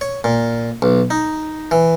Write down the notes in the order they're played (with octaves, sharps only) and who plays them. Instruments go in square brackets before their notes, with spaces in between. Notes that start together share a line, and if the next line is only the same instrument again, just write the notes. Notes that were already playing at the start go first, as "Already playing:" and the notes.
[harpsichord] C#5
A#2
B1
D#4
E3